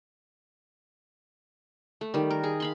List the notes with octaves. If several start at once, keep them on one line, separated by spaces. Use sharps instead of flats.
A3
D#3 G3
A#4
G#4
F5 B5 C6